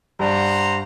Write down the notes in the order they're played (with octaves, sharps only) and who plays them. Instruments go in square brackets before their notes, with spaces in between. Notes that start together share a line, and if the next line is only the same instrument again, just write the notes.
[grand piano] G2 D5 [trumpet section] C5 F#5 A#5